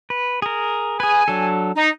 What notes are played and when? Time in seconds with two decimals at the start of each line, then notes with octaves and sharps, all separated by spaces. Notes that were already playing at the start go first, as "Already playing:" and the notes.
0.10 B4
0.42 G#4 A#4
1.00 G#4 B4 G#5
1.28 F#3 D4 A4
1.76 D#4